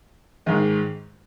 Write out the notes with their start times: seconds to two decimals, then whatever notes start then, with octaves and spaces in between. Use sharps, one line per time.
0.46 G#2 D#3 G#3